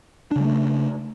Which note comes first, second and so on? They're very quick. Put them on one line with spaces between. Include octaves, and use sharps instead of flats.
D4 C#3 G3 A3